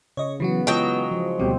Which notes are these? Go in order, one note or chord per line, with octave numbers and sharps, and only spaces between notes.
C#3 C#5 D#5 C#6
C#3 E3 F#3 B3 F#4
E3 F#3 G#3 F4 D#5 G5
F3
D2 B2 G3 C4 G4